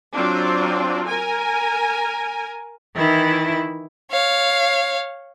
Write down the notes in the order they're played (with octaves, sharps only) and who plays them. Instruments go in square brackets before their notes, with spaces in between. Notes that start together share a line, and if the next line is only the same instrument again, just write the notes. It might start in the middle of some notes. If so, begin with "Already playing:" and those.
[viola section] F#3 C4 D4 F4
A#4 G#5
[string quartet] D#3 E3 E4
[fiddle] C#5 F5